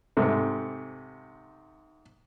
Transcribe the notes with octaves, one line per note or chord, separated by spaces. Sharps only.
G#2 C3 A3